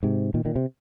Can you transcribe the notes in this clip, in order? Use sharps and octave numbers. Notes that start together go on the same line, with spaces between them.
G#2 C3
A#2 D#3
A#2 D#3
C3